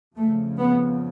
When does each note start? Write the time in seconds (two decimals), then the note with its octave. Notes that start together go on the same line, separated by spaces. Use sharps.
0.15 F2 C#3 A3
0.59 B3